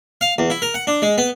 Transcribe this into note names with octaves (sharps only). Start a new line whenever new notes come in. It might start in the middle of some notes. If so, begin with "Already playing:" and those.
F5
E2
E4
A#4
F#5
D4
G#3
B3